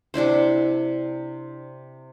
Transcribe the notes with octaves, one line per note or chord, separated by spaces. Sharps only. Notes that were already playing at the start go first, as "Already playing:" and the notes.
C3 D4 E4 C5